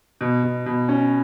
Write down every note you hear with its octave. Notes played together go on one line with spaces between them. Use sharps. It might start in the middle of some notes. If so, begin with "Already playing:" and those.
B2
B2
B2
C#4